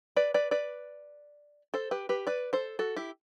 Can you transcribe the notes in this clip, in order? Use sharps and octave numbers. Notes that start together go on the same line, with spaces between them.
B4 D5
B4 D5
B4 D5
A4 C5
G4 B4
G4 B4
B4 D5
A4 C5
F#4 A4
E4 G4